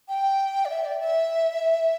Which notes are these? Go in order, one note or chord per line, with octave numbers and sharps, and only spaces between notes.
G5
D5
E5
D5
E5